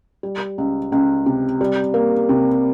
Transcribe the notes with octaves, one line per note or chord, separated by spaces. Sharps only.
G3
C#2
C#2
C3
G3
A#3
C3